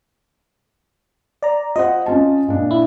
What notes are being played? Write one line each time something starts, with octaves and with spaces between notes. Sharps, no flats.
D5 A#5
F4 C5 D#5 F#5
C#4 F4 A5
A#2 D4
E4